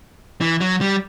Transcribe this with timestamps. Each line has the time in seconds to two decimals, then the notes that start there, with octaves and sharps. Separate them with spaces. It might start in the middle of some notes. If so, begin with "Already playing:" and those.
0.41 E3
0.61 F#3
0.81 G3